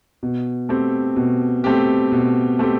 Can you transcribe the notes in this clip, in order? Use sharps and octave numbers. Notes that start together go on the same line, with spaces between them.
B2
A3 C4 G4
B2
A3 C4 G4
B2
A3 C4 G4